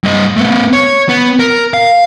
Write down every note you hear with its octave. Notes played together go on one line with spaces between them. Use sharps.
G2 D#5
A3 B3
C#5
B3
A#4
F5